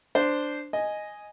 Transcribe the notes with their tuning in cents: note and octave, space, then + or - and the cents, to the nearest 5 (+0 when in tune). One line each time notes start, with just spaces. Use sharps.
D4 +0 C5 -10
D#5 +0 G#5 +0